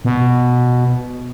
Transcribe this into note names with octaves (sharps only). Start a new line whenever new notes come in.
B2